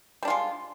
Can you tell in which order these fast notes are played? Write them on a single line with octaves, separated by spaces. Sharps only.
G3 D4 F4 G#3